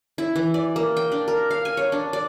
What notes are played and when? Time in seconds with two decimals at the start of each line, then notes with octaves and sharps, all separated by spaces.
0.18 E4
0.36 E3
0.54 D5
0.76 A#3
0.97 G5
1.12 D4
1.28 A#4
1.51 F5
1.65 G#5
1.77 C#5
1.92 D4
2.13 D5